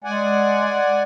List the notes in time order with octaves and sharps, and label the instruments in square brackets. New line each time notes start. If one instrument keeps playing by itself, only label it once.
[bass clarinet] G#3 [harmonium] D5 F#5 G#5